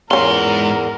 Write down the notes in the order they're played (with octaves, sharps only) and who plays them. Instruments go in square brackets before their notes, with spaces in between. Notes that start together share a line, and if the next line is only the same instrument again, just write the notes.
[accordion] E2 [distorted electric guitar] G#2 C6 [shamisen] C#4 F4 [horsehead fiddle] A#4